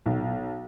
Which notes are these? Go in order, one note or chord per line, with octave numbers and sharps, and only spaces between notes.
B1